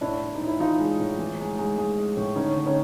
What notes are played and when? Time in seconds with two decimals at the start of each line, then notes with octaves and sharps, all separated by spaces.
0.01 A2 D4 E4
0.21 A2
0.35 D#4
0.41 A2
0.47 E4
0.60 E3 D#4 F4
0.80 G#3
0.99 A2
1.19 E3
1.39 G#3
1.59 G#3
1.78 G#3
1.98 G#3
2.17 A2
2.36 D3 C#4 D#4
2.56 D3
2.66 C#4 D#4